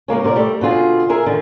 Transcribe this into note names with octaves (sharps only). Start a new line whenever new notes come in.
C#3 G#3 A#3 C#4
D#2 C3 F#4 A#4 D5
G3 A3
B2 D3 F4 G#4
G#4 A#4 E5
D3 D#3